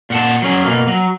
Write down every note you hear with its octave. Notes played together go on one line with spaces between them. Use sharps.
A#2 F#5 A5
F#3 C#4 G#4
B2 A#3
F#3